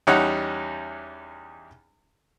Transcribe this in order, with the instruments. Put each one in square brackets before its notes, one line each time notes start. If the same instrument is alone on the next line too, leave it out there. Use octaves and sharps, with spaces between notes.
[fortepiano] E2 G3 C#4 D#4 C#5 F#5